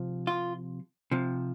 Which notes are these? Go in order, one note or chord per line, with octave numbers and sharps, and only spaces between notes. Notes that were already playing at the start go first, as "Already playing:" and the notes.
Already playing: C3 F3
F4
C3 F3